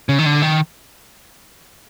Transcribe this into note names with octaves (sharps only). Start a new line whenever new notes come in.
C#3
D#3
D3
D#3